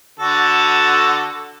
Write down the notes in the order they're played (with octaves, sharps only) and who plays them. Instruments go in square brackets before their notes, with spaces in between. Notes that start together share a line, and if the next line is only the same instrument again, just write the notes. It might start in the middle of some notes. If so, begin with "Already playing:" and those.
[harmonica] D3 F#4 A4